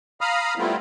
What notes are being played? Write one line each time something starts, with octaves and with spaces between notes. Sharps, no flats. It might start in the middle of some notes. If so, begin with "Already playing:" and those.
F5 A#5 B5 D#6 F6
G3 A3 B3 C4 E4 F4